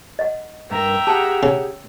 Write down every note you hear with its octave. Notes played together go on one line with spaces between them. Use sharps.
D#5 F#5
G2 A#4 E5 G5 A#5
G4 G#4 F#5 A5
C#3